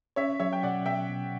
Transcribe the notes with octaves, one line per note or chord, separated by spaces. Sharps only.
C#4 C#5 E5
F#3 C#5 E5
G5
B2 D5 F#5
B2 E5 G5
B2